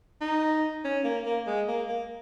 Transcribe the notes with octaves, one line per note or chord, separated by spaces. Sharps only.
D#4
C#4
A#3
A#3
G#3
A#3
A#3